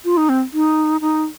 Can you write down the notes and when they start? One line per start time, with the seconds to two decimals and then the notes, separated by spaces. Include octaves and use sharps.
0.05 F4
0.17 D#4
0.29 C4
0.53 D#4
1.01 D#4